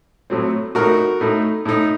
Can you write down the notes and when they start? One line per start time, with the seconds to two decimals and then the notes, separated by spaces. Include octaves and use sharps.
0.30 A2 F#3 A3 C4
0.75 A2 A3 D#4 F#4 A#4
1.21 A2 A3 D#4
1.65 A2 A3 D#4